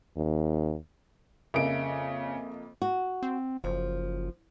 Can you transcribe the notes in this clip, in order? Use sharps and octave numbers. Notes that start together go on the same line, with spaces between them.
D#2
F2 C#3 A#3 G#4 A#4 D#5 E5 D7
F#4
C4
F#1 F3